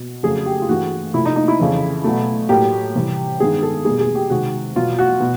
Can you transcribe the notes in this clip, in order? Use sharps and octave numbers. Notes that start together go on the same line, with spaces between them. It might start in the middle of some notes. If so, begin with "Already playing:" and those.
Already playing: B2
F2 C#3 F#3 A3 G#4
G4
F4
G2 E3 A3 F#4
C3 F3 A3 E4
D#4
D#4
E4
F2 C#3 E3
B2 F#3 A3
A2 F#3 A#3 G4
C3 E3 G3
G2 D#3 G#3 B3 G#4
A4
E2 B2 G3 A#3 G#4
G#4
G4
C3 D#3 G#3 F#4
E2 B2 F#3 F4
F#4
B2